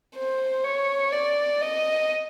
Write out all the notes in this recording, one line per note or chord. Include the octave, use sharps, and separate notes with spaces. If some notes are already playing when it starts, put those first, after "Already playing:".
C5
C#5
D5
D#5